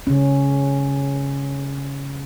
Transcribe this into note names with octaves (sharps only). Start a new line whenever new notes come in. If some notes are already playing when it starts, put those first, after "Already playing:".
C#3 C#4